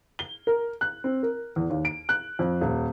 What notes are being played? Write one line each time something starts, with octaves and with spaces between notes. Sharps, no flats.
G7
A#4
F#6
C4
A#4
E2
D#2
D7
F#6
F2
D#1